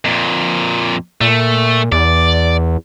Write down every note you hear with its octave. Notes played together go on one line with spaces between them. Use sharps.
F2 A#2
A#2 A3
E2 D5